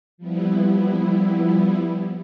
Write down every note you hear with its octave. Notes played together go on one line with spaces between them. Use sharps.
F3 G3 B3 E4